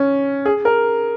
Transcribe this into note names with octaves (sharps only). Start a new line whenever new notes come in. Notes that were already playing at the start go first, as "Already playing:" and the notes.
Already playing: C#4
G#4
A#4